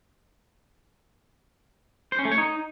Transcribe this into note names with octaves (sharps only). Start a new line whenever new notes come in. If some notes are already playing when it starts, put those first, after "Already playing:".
C5
C#4
A3
C#5
D#4